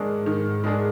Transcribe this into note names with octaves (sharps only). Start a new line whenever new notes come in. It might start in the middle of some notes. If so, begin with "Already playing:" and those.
Already playing: G#2 D#3 G#3 D4 G#4
D#3
G#3 D4 G#4